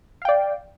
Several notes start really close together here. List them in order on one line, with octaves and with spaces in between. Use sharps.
F5 G5 D5